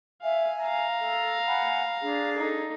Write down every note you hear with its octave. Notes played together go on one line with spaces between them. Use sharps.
E5 F5 G#5
F5 A#5
A4
F#5 G#5 B5
D4 G#4
D#4 A4